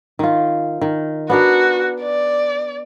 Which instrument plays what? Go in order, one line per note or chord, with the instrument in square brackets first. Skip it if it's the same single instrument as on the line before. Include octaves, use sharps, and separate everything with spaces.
[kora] D#3 F4
D#3
[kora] B3 D4 A#4 [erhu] F#4
[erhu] D5